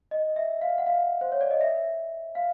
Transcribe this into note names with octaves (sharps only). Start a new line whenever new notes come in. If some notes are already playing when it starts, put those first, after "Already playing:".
D#5
E5
F5
F#5
F5
C5
C#5
D5
D#5
E5
F5